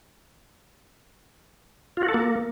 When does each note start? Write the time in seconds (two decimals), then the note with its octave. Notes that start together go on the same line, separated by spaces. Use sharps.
1.97 F4
2.03 F#4
2.08 A4
2.14 A#3